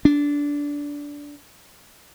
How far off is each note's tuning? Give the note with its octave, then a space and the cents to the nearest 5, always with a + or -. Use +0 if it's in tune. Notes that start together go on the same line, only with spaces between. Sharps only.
D4 -15